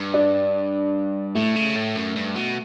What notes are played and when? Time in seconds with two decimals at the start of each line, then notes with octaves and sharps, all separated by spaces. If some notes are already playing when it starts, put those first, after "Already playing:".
Already playing: G2
0.14 D4
1.35 A2 A3
1.56 C#3
1.76 A2
1.96 F#2
2.16 G2
2.35 B2